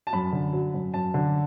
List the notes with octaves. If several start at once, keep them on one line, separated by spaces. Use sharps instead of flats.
A5
F#2 B5
D3
F#3
F#2
F#2 A5
D3